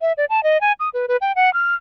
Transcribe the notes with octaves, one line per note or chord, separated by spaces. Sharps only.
E5
D5
A5
D#5
G#5
D#6
B4
B4
G5
F#5
F6